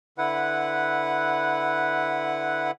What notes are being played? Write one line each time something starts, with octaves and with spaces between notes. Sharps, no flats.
D3 E4 B4 F#5